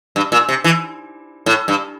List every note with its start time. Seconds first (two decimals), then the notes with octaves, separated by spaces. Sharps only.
0.16 G2
0.32 A#2
0.49 C3
0.64 E3
1.46 A2
1.68 G2